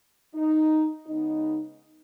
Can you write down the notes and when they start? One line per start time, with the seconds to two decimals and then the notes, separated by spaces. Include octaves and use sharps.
0.34 D#4
1.06 C#3 G#3 B3 D#4